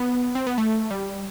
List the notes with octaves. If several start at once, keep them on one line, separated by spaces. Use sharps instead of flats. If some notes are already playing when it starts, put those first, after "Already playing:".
Already playing: B3
C4
B3
A3
G3